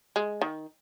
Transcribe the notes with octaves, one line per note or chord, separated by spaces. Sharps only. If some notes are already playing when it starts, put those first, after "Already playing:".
G#3
D#3